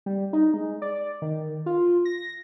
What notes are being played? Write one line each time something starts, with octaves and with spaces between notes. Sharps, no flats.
G3
D#4
G#3
D5
D#3
F4
A#6